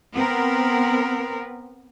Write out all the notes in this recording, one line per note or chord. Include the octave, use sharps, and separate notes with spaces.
B3 C4 A#4